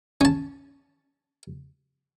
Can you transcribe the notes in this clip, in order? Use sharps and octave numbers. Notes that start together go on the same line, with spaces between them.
C#4 A5